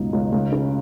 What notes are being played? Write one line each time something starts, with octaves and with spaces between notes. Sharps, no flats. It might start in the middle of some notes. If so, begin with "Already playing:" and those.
Already playing: C#2 F#2 B2 D#4
C#2
C#2
C#3